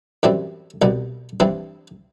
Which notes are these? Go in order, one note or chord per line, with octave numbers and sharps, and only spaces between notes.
F#2 E3 G3 C4
C2 B2 G3
G2 E3 G3 C4